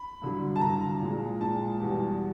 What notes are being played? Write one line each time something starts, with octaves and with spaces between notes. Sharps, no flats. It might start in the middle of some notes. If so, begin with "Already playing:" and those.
Already playing: B5
G2 D3 F#3
A5
G2 D3 F#3 A#5
A#2 F3 G#3
A#2 F3 G#3 A5
E2 B2 G3